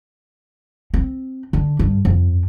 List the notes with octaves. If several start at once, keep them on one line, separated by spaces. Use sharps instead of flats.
C4
D3
G2
F2